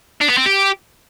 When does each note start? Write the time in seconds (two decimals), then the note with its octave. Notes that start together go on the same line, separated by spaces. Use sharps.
0.21 D4
0.29 B3
0.38 C4
0.46 G4